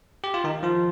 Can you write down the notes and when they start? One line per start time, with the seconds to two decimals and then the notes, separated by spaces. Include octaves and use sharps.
0.24 G4
0.34 F4
0.44 D#3 D#4
0.63 F3 F4